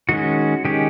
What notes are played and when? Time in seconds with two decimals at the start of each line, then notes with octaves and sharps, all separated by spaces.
0.09 D#3 G#3 C#4 F#4
0.65 D#3 G#3 C#4 G4